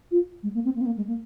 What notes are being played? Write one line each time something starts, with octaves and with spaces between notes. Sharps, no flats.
F4
G#3
A#3
C4
A#3
C4
A#3
G#3
A#3